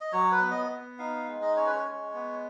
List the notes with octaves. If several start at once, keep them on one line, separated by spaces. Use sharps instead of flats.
D#5
F#3 C#5
B4
B3
D#5
B3
D#4 F5
G#3
D#5
C#4 C#5
B4
C#5
G#3
B3